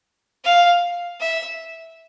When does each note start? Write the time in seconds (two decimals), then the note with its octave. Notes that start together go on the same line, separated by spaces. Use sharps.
0.45 F5
1.21 E5